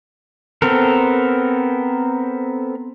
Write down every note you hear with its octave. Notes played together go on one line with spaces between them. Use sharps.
B3 C4 A4 A#4